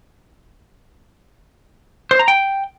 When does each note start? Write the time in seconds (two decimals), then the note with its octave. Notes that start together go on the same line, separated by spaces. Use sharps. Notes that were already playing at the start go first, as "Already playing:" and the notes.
2.11 C5
2.19 A#5
2.28 G5